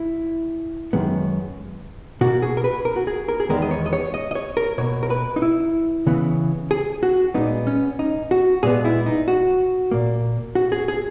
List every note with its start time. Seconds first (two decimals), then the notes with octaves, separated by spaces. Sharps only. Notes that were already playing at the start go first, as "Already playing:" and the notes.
Already playing: E4
0.93 F#2 D#3 G#3 B3
2.21 B2 A#3 F#4
2.42 G#4
2.57 A#4
2.64 B4
2.85 A#4
2.96 F#4
3.07 G#4
3.28 A#4
3.40 G#4
3.49 E2 D#3 G#3 B3 A#4
3.62 D#5
3.71 C#5
3.86 D#5
3.93 C#5
4.14 D#5
4.31 D#5
4.35 C#5
4.57 A#4
4.78 B2 A#3 C#5
5.03 A#4
5.10 B4
5.36 D#4
5.42 E4
6.07 C#3 E3 B3
6.71 G#4
7.03 F#4
7.34 A#2 G#3 B3 D#4
7.67 C#4
7.99 D#4
8.31 F#4
8.63 A#2 G#3 B3 G#4
8.85 E4
9.06 D#4
9.28 F#4
9.91 A#2 A#3
10.55 F#4
10.72 G#4
10.88 G#4